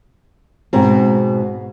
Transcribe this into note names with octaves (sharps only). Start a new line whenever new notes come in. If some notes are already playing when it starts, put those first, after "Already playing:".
G#2 B2 C4